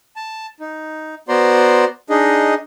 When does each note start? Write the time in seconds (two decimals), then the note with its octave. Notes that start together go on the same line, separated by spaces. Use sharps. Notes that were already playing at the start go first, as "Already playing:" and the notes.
0.16 A5
0.60 D#4
1.28 B3 F#4 C5 D5 A#5 C6
2.10 D4 D#4 G#4 D#5